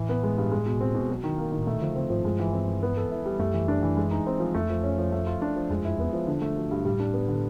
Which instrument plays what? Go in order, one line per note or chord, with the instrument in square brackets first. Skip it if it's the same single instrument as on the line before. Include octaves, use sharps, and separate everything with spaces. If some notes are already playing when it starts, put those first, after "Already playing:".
Already playing: [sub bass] A2 [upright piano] E3
[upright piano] B3
G#3
G2
G#3
B2
C4
B2
F#3
D#3
A#3
[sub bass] A2 [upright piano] D#3
[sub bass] A#2 [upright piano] A3
[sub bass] D3 [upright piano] F3
[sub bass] C#3 [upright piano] C4
[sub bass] G#2 [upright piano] F3
[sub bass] G2 [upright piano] G#3
[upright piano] E3
C4
E3
B3
A4
E4
G3
[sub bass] F#2 [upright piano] A3
[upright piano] E3
D4
E3
G#3
D#4
C4
F3
[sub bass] F2 [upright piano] A3
[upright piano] F3
C#4
F3
A3
F4
D4
F3
[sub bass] F2 [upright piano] G#3
[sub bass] F#2 [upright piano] E4
[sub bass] E2 [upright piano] B3
[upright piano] F3
D3
A3
F#3
G2
[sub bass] A2 [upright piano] G3
[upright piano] D4
B3
D3